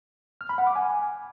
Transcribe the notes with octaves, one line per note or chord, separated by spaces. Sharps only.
F6
B5
F#5
D6
G#5